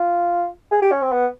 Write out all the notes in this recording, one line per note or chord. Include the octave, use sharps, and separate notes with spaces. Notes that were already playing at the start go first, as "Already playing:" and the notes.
Already playing: F4
G#4
G4
C#4
C4
B3